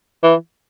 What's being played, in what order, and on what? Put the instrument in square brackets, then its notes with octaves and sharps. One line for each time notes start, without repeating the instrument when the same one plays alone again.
[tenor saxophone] E3